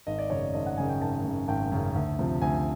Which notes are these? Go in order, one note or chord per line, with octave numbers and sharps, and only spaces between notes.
G#1 D#5
D5
F#2 C#3 C#5
D5
G#1 D#5
F#5
F#2 C#3 G#5
G5
G#1 A5
F#2 C#3
G#1 G5
F#2 C#3
D2
C3 F3
D2 G#5